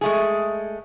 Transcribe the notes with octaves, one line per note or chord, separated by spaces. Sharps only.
G#3 A3 G#4